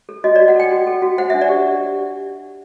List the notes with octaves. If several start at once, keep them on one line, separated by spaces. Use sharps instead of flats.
A4
F#4 D#5
D5
F#4
F#5
A4 G5
F#4
A4
F#4
C5 F#5
E5
D4
D5
G4